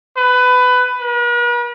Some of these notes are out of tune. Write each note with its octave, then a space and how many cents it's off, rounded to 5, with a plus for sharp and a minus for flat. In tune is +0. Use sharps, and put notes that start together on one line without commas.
B4 +15
B4 -45